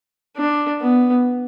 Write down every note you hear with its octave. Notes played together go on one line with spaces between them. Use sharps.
D4
B3